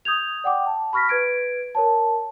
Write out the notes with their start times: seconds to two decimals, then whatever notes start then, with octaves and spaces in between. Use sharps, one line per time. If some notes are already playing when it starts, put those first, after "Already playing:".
0.05 D#6 G6 G#6 F7
0.44 D5 F#5 G5 D6
0.66 A5
0.93 B5 C#6 F6 A#6 B6
1.09 B4 G#6 D7
1.75 A#4 C#5 A5